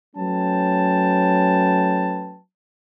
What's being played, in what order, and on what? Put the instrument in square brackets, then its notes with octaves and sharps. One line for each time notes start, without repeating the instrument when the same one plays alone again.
[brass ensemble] F#3 A3 C#4 B4 G5 A5